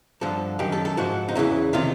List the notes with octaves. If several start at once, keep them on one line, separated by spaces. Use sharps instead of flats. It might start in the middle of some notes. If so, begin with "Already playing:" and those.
G2 D3 F3 A4
F#2 D#3 G4
A4
A4
G#2 F3 F#4
D#4
E2 C#3 E3 E4
C3 D#3 F4